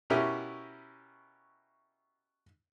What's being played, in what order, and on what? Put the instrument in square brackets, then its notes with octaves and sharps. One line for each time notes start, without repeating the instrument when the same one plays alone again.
[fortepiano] B2 C#4 E4 G4 A#4 E5